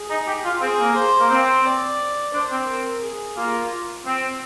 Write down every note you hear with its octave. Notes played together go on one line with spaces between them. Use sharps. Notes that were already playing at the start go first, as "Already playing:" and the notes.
Already playing: G#4
D#4
G4
F4
C4 G#4
A#3
C5
A#3
C4 C5
D5
D4 C5
C4
A#4
G#4
A#3 F4
C4